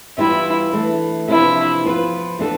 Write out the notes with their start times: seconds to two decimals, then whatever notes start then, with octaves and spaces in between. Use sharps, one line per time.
0.18 E3 G3 B3 E4 F4
0.73 E3 A3 D4 A4
1.28 C3 F3 B3 D4 E4
1.85 F3 B3 F4 B4
2.39 E3 B3 D4 F4 A4